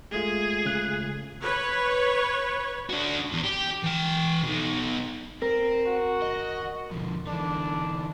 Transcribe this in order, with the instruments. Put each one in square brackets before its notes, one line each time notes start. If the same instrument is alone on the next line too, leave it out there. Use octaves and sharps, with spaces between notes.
[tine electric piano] G#3 A3 F4 [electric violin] G#4
[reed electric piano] C#3 F#6
[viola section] B4 C#5
[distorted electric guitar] D4 F#4
E2
G4
E3 G5
B2 D#4
[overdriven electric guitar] C4 [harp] A#4
[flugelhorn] F#4
[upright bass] G1 D#2 [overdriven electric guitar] D#5
[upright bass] E1 B2 [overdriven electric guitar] D3 F3
[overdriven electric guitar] D3 E3 [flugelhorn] D4